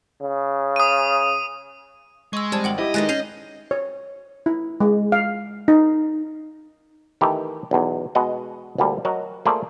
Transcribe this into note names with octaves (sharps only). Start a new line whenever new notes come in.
C#3
D#6 D#7
G#3 C#6 E6
F2 G3 D5 A5 G#6
G#1 F#5 G5 F#7
E4 G4 D#5
G2 D#3 G#3 G#5 F#6 A6
C#4 G#4 G6 C7 D#7 F7
C#5
E4
G#3
F5
D#4
D#3 E3 A3 G4
B1 E2
B2 G#3 D#5 F#5
D2 A#2 D3 G3
F#3 F#4 A#4 D#5
A3 A#3 F4 G#4 C5 D5